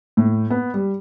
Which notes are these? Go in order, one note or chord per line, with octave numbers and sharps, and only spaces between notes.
A2
B3
G3